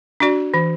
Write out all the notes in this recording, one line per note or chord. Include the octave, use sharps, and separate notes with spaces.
D4 F#4 D5
E3